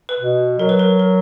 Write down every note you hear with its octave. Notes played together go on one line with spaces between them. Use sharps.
B4
B2
F#3 A#4
B4
A#4
A#4